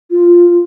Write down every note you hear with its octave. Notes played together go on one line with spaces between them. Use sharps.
F4